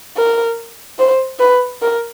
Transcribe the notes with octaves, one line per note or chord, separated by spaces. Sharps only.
A#4
C5
B4
A#4